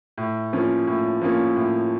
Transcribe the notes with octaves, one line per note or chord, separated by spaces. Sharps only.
A2
F3 A#3 C#4
A2
F3 A#3 C#4
A2